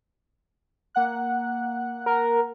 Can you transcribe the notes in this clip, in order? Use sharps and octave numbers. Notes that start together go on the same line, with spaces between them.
A#3 F#5 F#6
A#4